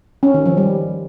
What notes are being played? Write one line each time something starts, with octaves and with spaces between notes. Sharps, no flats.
C#4
D#3
F3
G3